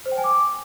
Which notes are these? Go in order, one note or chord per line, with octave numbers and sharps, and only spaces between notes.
C5
G5
G#5
D6